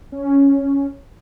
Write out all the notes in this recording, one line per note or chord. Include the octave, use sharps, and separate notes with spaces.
C#4